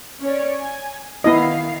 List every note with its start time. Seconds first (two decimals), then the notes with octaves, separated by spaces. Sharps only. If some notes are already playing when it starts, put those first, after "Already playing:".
0.22 C#4 C#5 D5
0.58 G#5
1.24 D#3 B3 E4 D#5 F5 C7